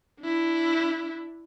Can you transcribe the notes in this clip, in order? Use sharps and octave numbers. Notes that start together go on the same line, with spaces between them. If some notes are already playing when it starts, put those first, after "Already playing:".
D4 E4